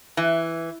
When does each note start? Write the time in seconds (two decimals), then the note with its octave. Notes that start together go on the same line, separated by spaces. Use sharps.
0.17 E3